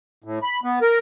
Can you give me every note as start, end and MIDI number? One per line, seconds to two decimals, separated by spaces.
0.24 0.39 45
0.43 0.60 83
0.64 0.79 59
0.82 0.98 70